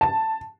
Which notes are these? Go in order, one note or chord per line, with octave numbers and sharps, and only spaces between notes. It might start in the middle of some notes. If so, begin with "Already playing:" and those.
A5